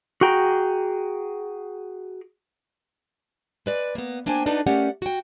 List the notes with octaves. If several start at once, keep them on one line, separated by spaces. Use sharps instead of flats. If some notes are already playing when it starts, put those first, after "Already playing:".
F#4 G#4 G5 A#5
G#3 B4 D5
A#3 B3
A#3 D4 C5 G5 G#5
D4 D#4 F#4 A4 B4 D5
A3 C#4 G4 A#4 D5 F#5
F#4 G5